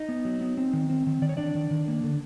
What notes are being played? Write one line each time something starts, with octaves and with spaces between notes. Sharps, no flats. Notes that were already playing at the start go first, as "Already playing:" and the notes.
Already playing: D#4 D#5
B3
F#3
B3
C4
D#3
C4
D#3
D#3 D5
C#5
D#3 D4 D5
D#3
D#3
A#3
D3